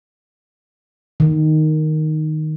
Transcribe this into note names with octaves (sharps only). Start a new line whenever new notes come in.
D#3